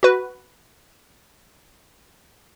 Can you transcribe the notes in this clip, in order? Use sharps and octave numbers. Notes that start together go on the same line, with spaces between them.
F#4 B4